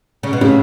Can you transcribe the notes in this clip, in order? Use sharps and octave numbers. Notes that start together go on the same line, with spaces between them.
C#3
B2
A2 C#3